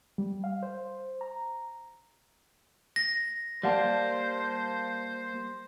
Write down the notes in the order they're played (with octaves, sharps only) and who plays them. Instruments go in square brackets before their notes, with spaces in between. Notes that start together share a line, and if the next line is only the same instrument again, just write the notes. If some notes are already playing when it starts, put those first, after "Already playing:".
[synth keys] G3
F5
C5
A#5
[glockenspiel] A#6
[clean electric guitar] G3 A#3 [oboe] C5 [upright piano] D5 F5 A5